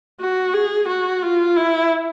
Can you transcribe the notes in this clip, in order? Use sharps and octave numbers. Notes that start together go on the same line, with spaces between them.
F#4
G#4
F#4
F4
E4